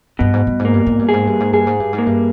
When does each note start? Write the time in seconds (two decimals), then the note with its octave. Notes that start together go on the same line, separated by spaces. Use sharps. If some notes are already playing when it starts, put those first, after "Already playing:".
0.19 G2 B2
0.33 G#2
0.47 G2
0.59 G#2
0.65 A#3
0.74 G2
0.86 G#2
0.99 G2
1.09 G#2 G#4
1.27 G2
1.40 G#2
1.53 G2 G#4
1.67 G#2
1.80 G2
1.93 G#2
1.98 A#3
2.06 G2